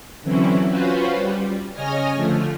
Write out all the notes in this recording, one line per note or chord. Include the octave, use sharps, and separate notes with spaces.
D3 E3 F#3 C4 C#4 E4
C#4 F4 F#4 B4 C5
G3
C#3 C#5 D#5 G#5 F6 A#6
D3 F3 A3